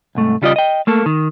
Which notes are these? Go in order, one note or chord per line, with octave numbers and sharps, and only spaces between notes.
C2 G#2 A3
C#3 G3 F4 D5 D#5
D#5 G5
A3 A#3 A4
D#3